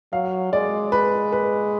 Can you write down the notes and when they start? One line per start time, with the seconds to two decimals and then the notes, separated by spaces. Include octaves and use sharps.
0.13 F#3 F5
0.52 G#3 D5
0.92 B4
1.33 B4